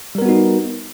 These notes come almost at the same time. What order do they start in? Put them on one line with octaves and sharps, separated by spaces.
G3 A#4 B3 F#4 D#4